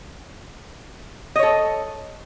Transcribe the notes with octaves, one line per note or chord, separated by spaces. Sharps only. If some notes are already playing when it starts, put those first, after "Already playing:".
A4 C#5 D#5